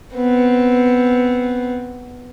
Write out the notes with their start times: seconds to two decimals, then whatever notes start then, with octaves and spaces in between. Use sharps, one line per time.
0.14 B3 C4